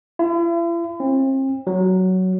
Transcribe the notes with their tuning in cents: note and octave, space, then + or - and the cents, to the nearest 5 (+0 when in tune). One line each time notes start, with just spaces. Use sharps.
E4 +45
C4 +35
F#3 +10